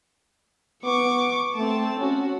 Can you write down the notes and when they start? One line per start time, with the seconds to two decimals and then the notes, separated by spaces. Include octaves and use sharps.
0.84 B3 C#6 D6
1.56 A3 C4 A5
1.99 C#4 F#4